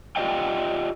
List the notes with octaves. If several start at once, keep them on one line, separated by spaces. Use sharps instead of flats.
F4 G4 D5 D#5 F5 G5